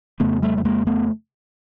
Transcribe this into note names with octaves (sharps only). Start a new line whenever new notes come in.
F2 C#3 A3 B3
G3 A3
A3
G#3 A#3
A3 B3